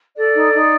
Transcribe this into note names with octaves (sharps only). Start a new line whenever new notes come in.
A4 D5
D#4
D#4